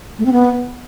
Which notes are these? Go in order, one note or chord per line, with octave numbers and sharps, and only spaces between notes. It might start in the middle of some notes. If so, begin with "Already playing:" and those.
A3
C4
B3